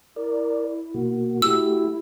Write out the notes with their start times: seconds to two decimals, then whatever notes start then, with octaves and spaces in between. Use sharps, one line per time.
0.16 E4 A#4 D5
0.94 B2 A#3 F#4
1.42 A3 E4 F#4 G4 E6